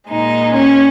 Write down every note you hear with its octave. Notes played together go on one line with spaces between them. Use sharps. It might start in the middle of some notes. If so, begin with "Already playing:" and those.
A#2 G#3 D#4
C#4